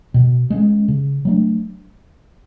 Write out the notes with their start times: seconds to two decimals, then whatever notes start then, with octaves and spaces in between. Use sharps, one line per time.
0.14 B2
0.50 G#3 C#4
0.88 C#3
1.25 F#3 A3 D4